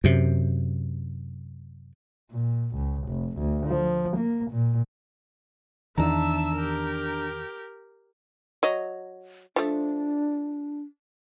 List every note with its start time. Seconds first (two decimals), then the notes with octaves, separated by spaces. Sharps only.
0.04 F#2 C3
2.31 A#2
2.76 C#2
3.08 F1
3.38 D2
3.67 F3
4.17 A#3
4.51 A#2
5.98 E2 D#3 D4 E5 A5 A#5 E6
6.56 G4 A#4
8.63 F#3 D#5
9.56 F3 A3 D4